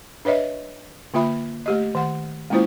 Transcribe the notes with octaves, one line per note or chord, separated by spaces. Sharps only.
D4 B4 C#5 D#5 E5
D3 A#3 F4 E5 B5
A3 G4 D#5
D#3 F#5
G#3 A#3 C#4 E4 F4 C5